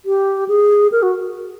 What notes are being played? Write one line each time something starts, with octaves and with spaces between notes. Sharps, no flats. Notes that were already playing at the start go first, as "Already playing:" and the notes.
G4
G#4
A#4
F#4